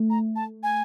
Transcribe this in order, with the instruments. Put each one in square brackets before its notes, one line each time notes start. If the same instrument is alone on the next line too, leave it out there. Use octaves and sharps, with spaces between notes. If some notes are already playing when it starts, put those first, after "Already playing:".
Already playing: [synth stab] A3
[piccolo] A#5
A5
G#5